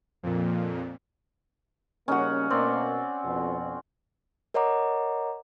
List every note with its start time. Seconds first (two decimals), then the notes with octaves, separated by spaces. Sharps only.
0.23 F2 A#2
2.08 C#3 G3 A#3 C#4 D#4 F#4 F#5
2.50 B2 A#3 C4 D5
3.24 F2 B2
4.54 A#4 C#5 D#5 F#5 A#5 D6